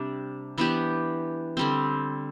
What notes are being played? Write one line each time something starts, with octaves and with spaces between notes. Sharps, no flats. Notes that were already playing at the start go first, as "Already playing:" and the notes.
Already playing: C3 G3 D4
E3 B3 D4 G4
D3 G3 C4